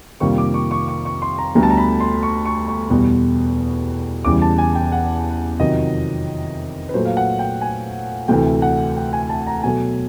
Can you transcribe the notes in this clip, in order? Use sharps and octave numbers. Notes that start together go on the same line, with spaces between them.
F2 C3 D#3 G3 A#3 C#6
D6
C#6
C#6
C#6
C#6
C6
A#5
D2 D3 G3 B3 A#5
A5
A#5
B5
C6
C#6
C#6
C#6
E2 B2 G3 B3
E2 C#3 E3 G3 D6
A5
G#5
G5
F#5
F2 C3 D#3 F#3 D#5
B4
A#2 F#3 A3 C5
F5
F#5
G5
G#5
D2 C3 E3 A3 G5
F#5
G5
G#5
A5
A#5
B2 F#3 A3 G#5